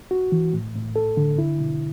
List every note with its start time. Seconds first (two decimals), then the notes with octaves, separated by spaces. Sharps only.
0.11 F#4
0.32 E3
0.53 A2
0.75 A2
0.96 A4
1.17 D3
1.38 E4
1.60 B2